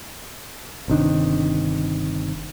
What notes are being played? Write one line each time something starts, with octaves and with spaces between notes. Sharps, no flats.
G1 C3 D#3 D4